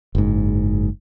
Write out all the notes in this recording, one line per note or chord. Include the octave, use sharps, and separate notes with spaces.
F#1 G#2